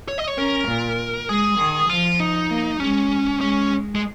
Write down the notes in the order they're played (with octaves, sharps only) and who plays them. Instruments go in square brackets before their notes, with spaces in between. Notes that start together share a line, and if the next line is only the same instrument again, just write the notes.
[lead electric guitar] C#5
D#5
C#5
[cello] C#4 [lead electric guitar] A#4
[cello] A#2
[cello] G#3 [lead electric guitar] G#4
[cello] D#3
[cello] F3 [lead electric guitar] F4
[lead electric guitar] D#4
[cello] A#3
[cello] G#3 [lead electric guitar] C#4
[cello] G#3 [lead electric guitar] C#4
[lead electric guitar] G#3